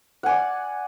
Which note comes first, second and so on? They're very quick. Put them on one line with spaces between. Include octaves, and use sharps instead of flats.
F#5 G#5 D5